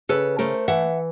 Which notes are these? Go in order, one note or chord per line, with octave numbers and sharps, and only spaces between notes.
C#3 A4 B4
A3 A#4 C5
E3 E5 F#5